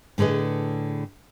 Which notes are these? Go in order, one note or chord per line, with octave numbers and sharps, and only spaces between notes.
A2 D3 G#4 B4 D#5